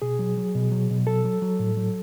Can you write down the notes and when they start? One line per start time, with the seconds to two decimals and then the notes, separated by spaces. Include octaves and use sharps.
0.02 B2 G#4
0.19 F#3
0.38 F#3
0.55 B2
0.72 F#3
0.90 B2
1.07 F#3 A4
1.25 F#3
1.42 F#3
1.60 A2
1.77 F#3